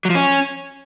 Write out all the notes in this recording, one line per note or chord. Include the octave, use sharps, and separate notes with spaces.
F#3
F3
C#4